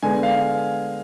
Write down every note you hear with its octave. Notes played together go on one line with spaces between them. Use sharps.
D3 G#3 B3 G#5
F5